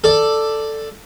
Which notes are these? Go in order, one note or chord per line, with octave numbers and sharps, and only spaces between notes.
A4 D5